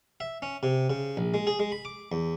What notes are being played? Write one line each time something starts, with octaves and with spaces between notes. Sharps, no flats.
E5
C#4
C3
C#3
A#1
G#3
G#4
G#3
B5
D6
E2